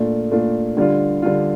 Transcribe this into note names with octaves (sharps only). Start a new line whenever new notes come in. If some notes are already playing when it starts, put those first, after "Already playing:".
Already playing: A#2 A3 D4 F4
A#2 A3 D4 F4
D3 G3 D4 F4
D3 G3 D4 F4